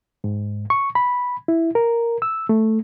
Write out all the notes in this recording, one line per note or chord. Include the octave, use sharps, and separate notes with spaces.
G#2
C#6
B5
E4
A#4
E6
A3